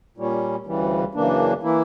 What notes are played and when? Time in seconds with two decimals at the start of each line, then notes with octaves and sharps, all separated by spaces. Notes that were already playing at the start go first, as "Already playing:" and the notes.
0.18 A#2 G3 C#4
0.66 D2 C#3 E3 G3
1.14 F#2 C#3 E3 A#3 D4
1.63 E3 A#3 E4